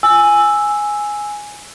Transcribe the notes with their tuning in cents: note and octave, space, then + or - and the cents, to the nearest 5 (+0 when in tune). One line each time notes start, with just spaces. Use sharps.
G#5 +0 E6 +0